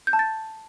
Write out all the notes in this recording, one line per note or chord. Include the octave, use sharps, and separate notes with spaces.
G6
A5
A6